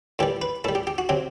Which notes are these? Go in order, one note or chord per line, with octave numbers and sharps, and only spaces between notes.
A2 E3 G3 G4
B4
A2 G3 A4
G4
G4
F#4
C3 F#3 G4